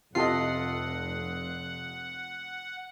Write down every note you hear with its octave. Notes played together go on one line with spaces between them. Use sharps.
F1 C3 F4 A4 D#5 F#5 C7